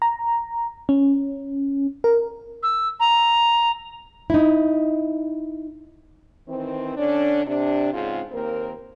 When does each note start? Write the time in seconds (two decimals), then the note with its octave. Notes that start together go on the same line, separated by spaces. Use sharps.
0.02 A#5
0.89 C#4
2.04 A#4
2.63 E6
3.00 A#5
4.30 D#4 E4
6.48 D#3 E3 C4
6.97 D3 C#4 D4
7.45 C3 D4
7.92 G#2 C#3 C4 F4 C5
8.31 D#2 A#3 C4 A#4